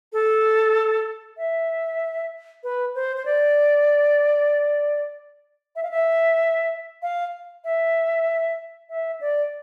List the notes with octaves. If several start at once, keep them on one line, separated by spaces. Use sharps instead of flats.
A4
E5
B4
C5
C5
D5
E5
F5
E5
F5
E5
E5
D5